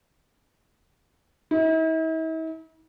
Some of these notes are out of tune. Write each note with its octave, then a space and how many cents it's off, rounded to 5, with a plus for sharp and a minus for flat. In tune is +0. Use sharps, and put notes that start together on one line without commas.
E4 -45